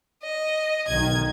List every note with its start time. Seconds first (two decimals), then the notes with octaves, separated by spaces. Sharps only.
0.23 D#5
0.88 B1 D#3 G#6